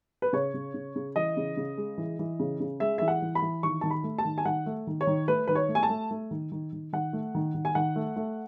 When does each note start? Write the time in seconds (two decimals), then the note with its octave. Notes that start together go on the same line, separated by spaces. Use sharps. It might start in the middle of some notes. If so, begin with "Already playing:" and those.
0.22 B4
0.33 C#3 C#5
0.54 C#3
0.74 C#3
0.96 C#3
1.16 E3 D#5
1.37 C#3
1.57 C#3
1.77 G#3
1.98 E3
2.19 E3
2.40 C#3
2.60 C#3
2.80 G#3 E5
2.98 E3 E5
3.08 F#5
3.22 E3
3.35 B5
3.42 E3
3.63 D#3 C#6
3.81 D#3 A5
3.91 B5
4.04 A3
4.19 A5
4.25 D#3
4.38 G#5
4.45 D#3 F#5
4.66 A3
4.87 D#3
5.01 C#5
5.07 D#3
5.28 A3 B4
5.48 D#3 B4
5.55 C#5
5.69 A3
5.75 G#5
5.83 A5
5.90 A3
6.11 A3
6.31 D#3
6.52 D#3
6.73 D#3
6.93 D#3 F#5
7.13 A3
7.35 D#3
7.54 D#3
7.65 G#5
7.75 D#3 F#5
7.96 A3
8.16 A3